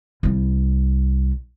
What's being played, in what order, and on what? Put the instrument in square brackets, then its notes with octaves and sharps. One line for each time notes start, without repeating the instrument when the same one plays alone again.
[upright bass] C2 G3